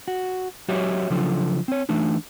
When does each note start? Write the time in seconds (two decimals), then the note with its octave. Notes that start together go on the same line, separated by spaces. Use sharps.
0.08 F#4
0.68 F#3 F#4 G4 C#5 D#5 E5
1.10 C#3 F3 F#3 D4 F4 A4
1.68 C4 C#5
1.89 E3 A3 D4 D#4